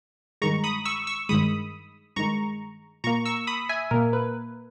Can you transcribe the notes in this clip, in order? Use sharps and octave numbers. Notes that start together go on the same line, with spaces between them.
G2 D#3 G#3 A#5 C#6
B5 D#6
C#6 E6
C#6 E6
G2 D#3 G#3 B5 D#6
G2 D#3 G#3 A#5 C#6
A#2 A#3 A#5 C#6
C#6 E6
B5 D#6
E5 G#5
A#2 A#3 A#4
B4